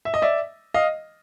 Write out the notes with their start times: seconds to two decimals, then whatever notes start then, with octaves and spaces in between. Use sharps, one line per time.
0.05 E5
0.14 D#5
0.22 D5 E5
0.74 D#5 F5